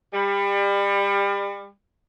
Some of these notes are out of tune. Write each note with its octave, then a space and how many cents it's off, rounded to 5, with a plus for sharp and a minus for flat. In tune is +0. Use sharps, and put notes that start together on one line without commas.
G3 +30